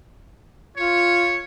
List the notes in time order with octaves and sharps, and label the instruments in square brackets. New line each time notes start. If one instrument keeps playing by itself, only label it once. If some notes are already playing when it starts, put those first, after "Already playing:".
[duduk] F4 [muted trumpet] C#5